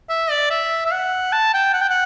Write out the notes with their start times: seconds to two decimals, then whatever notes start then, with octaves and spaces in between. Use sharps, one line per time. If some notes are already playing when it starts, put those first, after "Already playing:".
0.10 E5
0.30 D5
0.50 E5
0.86 E5
0.92 F#5
1.33 A5
1.54 G5
1.73 F#5
1.81 G5
1.89 F#5